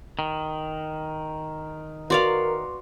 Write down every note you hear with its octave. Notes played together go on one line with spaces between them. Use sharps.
D#3
F#4 A#4 B4 D5 F5 C6 D6